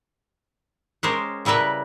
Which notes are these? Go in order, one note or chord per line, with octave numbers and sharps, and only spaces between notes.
G#3 C#4 G4 A#4 C5
C#3 G3 E4 A#4 B4